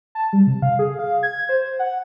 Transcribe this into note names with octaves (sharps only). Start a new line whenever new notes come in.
A5
G3
C3
F5
G#4
F5
G#6
C5
F#5